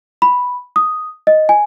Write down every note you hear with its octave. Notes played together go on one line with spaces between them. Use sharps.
B5
D#6
D#5
G#5